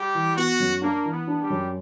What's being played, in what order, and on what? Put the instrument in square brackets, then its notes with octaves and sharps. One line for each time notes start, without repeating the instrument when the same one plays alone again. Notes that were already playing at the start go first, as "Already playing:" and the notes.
Already playing: [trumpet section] G3 G4
[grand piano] E3
[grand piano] B3 [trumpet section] F#4
[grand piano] F#2
[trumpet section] A#3 [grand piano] D4
[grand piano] E3
[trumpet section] B3
[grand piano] D4
[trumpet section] G3 G4
[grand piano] F#2